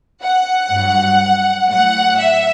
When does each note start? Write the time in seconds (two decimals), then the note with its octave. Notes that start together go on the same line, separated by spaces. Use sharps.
0.22 F#5
0.71 G2 F#3
1.69 A2 F#3 F#5
2.18 E5